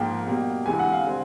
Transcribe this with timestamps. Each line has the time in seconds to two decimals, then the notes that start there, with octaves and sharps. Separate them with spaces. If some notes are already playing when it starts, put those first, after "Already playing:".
Already playing: G#2 F3 A#3 G5
0.27 B2 G3 A#3
0.66 D2 C3 E3 G#3 G#5
0.79 F#5
0.92 F5
1.07 D3 G3 C4